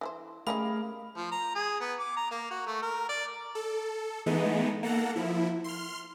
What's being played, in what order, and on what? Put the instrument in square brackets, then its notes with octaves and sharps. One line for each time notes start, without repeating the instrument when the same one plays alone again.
[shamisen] E3 A4 C5
[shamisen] G3 C#4 D#4 [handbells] A3 [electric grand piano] G#4 A#4 F5 [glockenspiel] B5
[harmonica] F3
A#5
G#4
B3
D6
A#5
A#3
F#4
A3
A#4
D5
[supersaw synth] A4
E3 G#3 A3 B3 D#4
A#3 A4 F#5 A#5
F3 E4
C6 F6